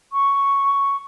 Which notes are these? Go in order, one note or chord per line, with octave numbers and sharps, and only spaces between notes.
C#6